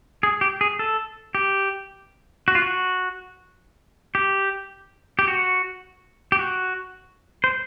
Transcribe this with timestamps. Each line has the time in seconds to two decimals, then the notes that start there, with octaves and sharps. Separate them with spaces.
0.23 G#4
0.41 G4
0.61 G#4
0.79 A4
1.35 G4
2.48 F#4
2.55 F4
2.62 F#4
4.15 G4
5.19 G4
5.28 F#4
6.32 G4
6.39 F#4
7.44 C5